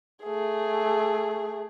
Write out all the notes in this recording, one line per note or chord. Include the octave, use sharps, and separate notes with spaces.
A3 G#4